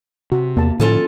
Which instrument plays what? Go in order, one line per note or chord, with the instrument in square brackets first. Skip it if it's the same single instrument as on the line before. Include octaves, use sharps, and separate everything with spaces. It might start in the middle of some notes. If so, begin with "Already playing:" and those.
[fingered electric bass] C3 [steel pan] F#4
[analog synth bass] E2 [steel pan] A#3 A5
[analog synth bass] A2 [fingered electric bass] D3 F3 C#4 [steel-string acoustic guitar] F4 A4 G#5